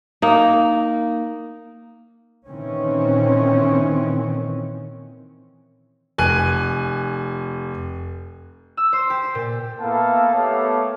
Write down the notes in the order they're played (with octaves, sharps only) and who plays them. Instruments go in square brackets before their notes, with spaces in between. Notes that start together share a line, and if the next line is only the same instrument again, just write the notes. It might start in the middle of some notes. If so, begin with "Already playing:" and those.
[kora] A#3 D#4
[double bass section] A#2 D#3 E3 C4 C#4
[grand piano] F1 G#5 F#6 D#7
[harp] E6
C5
G4
A#2
[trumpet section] A#3 B3 E4 A4 F5 A5
A3 B3 G4 A4 C#5 F5